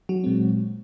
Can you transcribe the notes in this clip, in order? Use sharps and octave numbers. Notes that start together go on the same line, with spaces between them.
F#3 F#4
A#2 G#3 C4